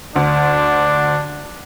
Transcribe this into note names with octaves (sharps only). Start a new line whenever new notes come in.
D2 D4